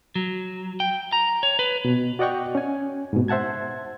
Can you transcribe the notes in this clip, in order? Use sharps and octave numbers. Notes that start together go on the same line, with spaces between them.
F#3
G5
A#5
C#5
B4
B2
F#4 D5 D#5 F#5 G5 C#6
C#4 G#5
G#2 B2
C5 E5 F#5 A5 G#6